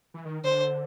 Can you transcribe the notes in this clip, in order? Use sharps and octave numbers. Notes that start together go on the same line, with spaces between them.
E3
D#3
D3 C5